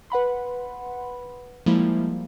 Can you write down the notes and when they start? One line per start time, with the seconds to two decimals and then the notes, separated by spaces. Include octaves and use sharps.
0.10 B4 F#5 B5 C6
1.66 F3 G3 G#3 A#3 E4